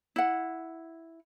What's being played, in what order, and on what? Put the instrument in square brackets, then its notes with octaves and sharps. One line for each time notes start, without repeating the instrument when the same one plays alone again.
[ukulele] E4 F#5